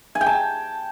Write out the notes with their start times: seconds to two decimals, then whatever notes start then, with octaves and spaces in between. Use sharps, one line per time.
0.15 G#5
0.21 G5
0.26 A5